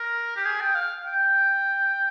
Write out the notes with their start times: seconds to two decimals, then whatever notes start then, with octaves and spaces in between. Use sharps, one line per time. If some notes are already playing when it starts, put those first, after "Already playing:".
Already playing: A#4
0.36 G4
0.46 G#4
0.61 G5
0.75 F5
1.06 G5